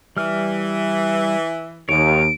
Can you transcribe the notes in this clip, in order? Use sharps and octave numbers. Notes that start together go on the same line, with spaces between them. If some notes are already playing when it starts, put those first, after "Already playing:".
E3 G3 F6
D#2 C#5 D7